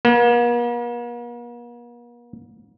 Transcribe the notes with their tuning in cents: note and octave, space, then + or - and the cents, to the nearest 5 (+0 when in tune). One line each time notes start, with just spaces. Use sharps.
A#3 +45